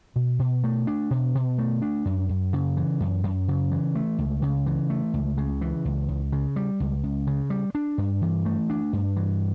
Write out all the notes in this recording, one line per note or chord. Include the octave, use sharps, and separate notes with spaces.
B2
B2
A3
D4
B2
B2
A3
D4
F#2
F#2
C#3
E3
F#2
F#2
C#3
E3
A3
C#2
C#3
E3
A3
C#2
C#3
E3
C#2
C#2
C#3
G3
C#2
C#2
C#3
G3
D4
G2
E3
A3
D4
G2
E3